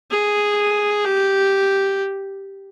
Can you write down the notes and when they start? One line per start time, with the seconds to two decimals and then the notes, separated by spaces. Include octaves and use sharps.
0.11 G#4
1.05 G4